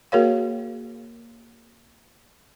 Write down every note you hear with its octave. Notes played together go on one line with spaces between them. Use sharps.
A#3 F#4 G#4 A#4 C#5 F5